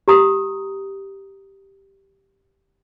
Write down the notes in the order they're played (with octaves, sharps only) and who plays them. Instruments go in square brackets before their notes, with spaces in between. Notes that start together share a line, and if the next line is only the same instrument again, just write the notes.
[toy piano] G4 A#5 D#6